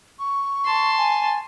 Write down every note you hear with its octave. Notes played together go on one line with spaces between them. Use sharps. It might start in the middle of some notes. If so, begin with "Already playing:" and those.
C#6
A5 C6
G#5